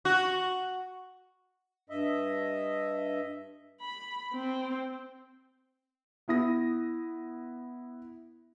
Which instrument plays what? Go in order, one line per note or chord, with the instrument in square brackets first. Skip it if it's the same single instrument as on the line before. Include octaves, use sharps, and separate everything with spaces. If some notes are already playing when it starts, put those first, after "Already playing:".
[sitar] F#4
[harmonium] G2 D#5 E5
[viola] B5
C4
[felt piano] B3 E4 D#6 A#6